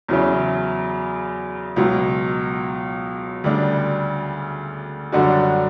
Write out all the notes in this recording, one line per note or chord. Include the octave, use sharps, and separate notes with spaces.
E2 C#3 F#3 C#4 E4
C#2 B2 F#3
D2 C#3 G3 D4
F#2 D3 G3 D4 F#4